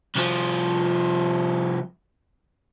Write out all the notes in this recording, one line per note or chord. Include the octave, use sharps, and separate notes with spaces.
C2 F3